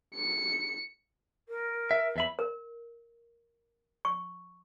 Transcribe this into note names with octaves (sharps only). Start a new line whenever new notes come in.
C#7
A#4
E5
E2 E5 B5
A#4
C#6